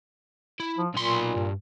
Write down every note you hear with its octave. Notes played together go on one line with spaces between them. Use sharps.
E4
F3
B1 A#2 C6
G2